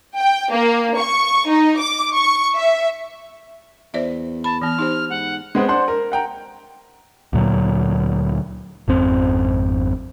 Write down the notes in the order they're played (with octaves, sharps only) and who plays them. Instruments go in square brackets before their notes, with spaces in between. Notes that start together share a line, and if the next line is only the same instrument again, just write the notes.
[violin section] G5
A#3
C#6
D#4
D6
C#6
E5
[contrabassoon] E2 [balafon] C5 D5 E5
[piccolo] A5 [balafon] B5
[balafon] E3 B3 [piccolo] F6
[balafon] D#4 G4 C5
[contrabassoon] G#2 [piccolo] F#5
[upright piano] G#3 B3 C4
D4 C5 F#5 C6
A#4
F#5 G5 A#5
[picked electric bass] D2 A#2 F#3
G#1 F2 C4